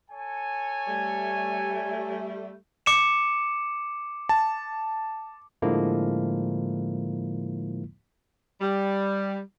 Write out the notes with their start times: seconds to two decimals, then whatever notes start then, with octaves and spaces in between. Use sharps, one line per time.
0.11 A4 C#5 G#5
0.88 G3 A3
2.86 D6 C#7 E7
4.29 A5
5.62 A2 D3 F3 G#3 A#3 E4
8.60 G3